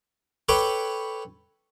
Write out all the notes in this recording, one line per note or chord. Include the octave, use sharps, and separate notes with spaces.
A4 B4 C#5 G5 D6